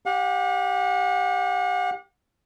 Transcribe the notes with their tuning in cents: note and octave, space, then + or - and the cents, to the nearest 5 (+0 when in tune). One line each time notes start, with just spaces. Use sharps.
G4 +0 F#5 -40